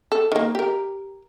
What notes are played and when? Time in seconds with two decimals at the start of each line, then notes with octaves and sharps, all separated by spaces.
0.12 A4
0.32 D#3 A#3
0.55 G4 A#4